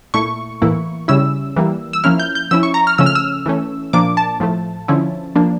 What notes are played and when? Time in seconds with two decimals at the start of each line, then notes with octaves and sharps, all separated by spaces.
0.14 A#2 A3 E4 C#6
0.62 A2 E3 A#3 E4
1.08 C#3 G3 C#4 E4 E6
1.56 E3 G3 A#3
1.93 E6
2.04 F3 A#3 C#4 E4 F6
2.20 G6
2.35 G6
2.51 F3 C#4 E4 E6
2.63 C#6
2.74 A#5
2.87 F6
2.98 C#3 F3 A3 C#4 E6
3.06 F6
3.15 E6
3.46 E3 A3 C#4
3.93 A#2 F3 A#3 D4 D6
4.17 A5
4.40 A2 F3 A3
4.88 D3 F3 C#4 E4
5.35 F3 A#3 D4